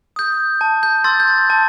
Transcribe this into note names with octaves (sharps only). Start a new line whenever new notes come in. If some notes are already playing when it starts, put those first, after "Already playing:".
D#6 G6
A5
G6
C6 E6 G6 A6
G6
A6
A5